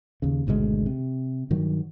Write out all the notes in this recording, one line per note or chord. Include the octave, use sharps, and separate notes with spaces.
D#2 C#3
G#1 D2 B2 G#3
C3
G2 D#3 F#3